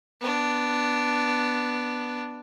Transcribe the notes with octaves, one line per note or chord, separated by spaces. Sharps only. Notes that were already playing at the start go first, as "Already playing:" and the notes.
B3 D4